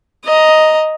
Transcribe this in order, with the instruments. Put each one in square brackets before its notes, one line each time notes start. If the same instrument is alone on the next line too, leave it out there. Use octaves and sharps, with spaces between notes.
[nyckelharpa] D#5 A#5